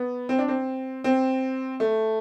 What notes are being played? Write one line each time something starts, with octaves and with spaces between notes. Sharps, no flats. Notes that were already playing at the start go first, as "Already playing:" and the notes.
Already playing: B3
C4
D4
C4
C4
A3